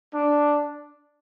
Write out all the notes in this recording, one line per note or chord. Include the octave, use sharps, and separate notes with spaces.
D4